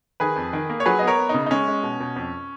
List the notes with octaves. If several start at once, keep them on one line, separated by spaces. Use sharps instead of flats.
D#3 G#4 B4
F2
D#3
A#3
C#5
F#3 G#4 B4
B3 D#5
A#4 C#5
B3
C#3 D#4
D#4
G#3 C#4
G#3
B2
B2
F2